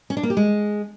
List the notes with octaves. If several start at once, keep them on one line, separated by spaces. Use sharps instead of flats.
C#4
D4
A#3
G4
G#3